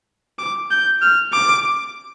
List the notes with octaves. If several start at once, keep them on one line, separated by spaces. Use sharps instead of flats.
D6
G6
F6
D6